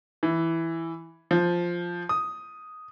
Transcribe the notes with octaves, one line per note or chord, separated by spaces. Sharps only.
E3
F3
D#6